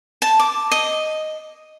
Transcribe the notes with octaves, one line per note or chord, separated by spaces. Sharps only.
A5
D6
D#5